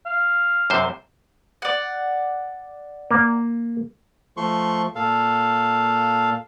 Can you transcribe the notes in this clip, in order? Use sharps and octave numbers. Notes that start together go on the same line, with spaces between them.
F5
F#2 C3 C5
D5 F#5
A#3
F3 A3 C6 C#6
A#2 A4 F5